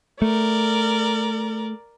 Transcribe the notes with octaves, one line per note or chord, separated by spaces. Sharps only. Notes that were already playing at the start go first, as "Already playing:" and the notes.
A3 A#4 D5